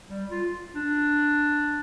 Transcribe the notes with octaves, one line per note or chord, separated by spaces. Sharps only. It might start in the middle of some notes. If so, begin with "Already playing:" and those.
G3
F4
D4